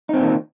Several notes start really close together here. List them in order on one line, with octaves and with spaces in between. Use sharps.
D#4 C4 A#2 D#3